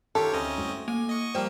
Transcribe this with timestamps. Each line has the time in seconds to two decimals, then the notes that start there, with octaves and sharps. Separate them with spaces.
0.15 D#3 F4 G4 A4 C#5
0.33 D2 C4 C#4 D#5
0.58 A3 E4 F#4
0.88 A#3 G#5
1.08 D#5 C#6
1.35 F3 G3 A#3 C5 G5 F6